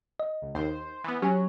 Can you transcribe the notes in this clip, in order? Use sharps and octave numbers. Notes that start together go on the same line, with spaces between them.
D#5
C#2
D#2 C5
E3 B3
F#3 C#4 G4 G#5